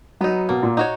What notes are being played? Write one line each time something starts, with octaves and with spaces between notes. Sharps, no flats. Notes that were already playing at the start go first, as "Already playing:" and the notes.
F#3 B3 D#4
B2 A#3
A#2
D#4 F#4 C#5